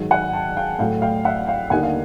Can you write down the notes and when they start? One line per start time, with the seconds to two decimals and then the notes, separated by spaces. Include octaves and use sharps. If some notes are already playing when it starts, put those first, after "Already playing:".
Already playing: G#2 D#3 F#3
0.11 F#5 G#5
0.33 G5 A5
0.57 F5 G5
0.79 A2 F#3 A3 F5 G5
1.02 F5 G5
1.25 E5 F#5
1.47 F5 G5
1.70 D#2 D3 G3 A#3 D#4 F#5 G#5
1.83 F5